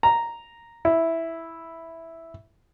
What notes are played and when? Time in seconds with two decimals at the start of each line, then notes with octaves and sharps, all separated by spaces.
0.03 A#5
0.85 E4